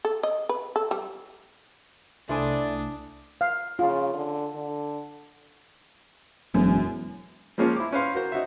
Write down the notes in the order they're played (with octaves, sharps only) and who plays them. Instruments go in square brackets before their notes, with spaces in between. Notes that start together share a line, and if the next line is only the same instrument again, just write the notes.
[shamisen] A4
D#5
B4
A4
G3
[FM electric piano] C2 A3 D#6 [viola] D4 [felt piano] E4 C5 G#5 [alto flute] D5
[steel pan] F5
[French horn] C#3 [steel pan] F4
[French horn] D3
D3
[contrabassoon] E1 [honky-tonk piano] F#2
[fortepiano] F3 G#3 A#3 C4 C#4 F4
E4 D6
C#4 B4 C5 F5 C6
F#4 A#4 C5
D#4 F#4 E5